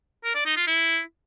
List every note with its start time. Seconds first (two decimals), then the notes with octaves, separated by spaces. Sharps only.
0.24 A#4
0.35 D5
0.46 D#4
0.56 F4
0.67 E4